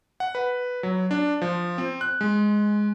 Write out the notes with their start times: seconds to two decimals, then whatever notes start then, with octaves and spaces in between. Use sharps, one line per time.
0.20 F#5
0.35 B4
0.83 F#3
1.11 D4
1.42 F3
1.78 C4
2.01 F#6
2.21 G#3